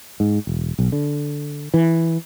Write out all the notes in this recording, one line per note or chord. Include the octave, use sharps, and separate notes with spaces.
G#2
E1
B1
D3
E3